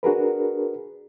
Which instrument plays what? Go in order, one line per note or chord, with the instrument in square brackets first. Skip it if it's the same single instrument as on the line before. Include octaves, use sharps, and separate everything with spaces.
[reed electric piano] D4 F#4 G#4 A#4 B4